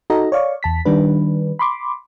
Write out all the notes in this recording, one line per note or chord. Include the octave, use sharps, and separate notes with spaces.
D#4 F#4 A4 D#5 A#5
C#5 D5 F5 C#6
E2 A5 B6
D#3 G3 D4 B4
B5 C6 D6